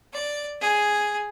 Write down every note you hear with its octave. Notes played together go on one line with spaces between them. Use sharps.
D5
G#4